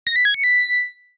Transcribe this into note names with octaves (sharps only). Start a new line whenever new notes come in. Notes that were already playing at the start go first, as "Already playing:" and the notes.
A#6
B6
G#6
C#7
B6